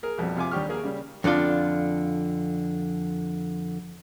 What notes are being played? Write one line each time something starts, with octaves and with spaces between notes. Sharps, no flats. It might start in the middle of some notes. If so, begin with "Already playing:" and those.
G#4 A#4
B1 F2 G3
C3 F4 G#5 D6
D#2 G3 D4 G4 C#6 F6
A#3 G#4 A#4
C#3 G3
F2 D3 D4 F4